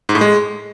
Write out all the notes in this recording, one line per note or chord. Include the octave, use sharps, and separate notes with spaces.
G#2
A2
G#3